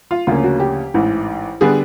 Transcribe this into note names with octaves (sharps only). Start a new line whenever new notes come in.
F4
D2 C#3 F3 A#3 C#4 F4
F#4
G4
A1 G#2 E3
D3 G3 B3 D4 G#4